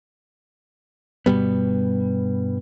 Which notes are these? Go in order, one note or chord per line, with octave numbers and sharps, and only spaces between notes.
G2 B2 G3 B3